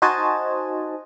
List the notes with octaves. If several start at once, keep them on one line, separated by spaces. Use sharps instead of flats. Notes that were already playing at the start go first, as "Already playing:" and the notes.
D#4 F#4 C5 D#5 G#5 A5